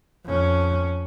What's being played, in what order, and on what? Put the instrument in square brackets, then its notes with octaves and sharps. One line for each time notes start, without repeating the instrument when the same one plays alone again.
[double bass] F2 C#4